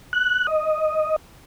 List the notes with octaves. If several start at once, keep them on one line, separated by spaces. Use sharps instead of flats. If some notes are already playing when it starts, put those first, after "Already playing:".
F#6
D#5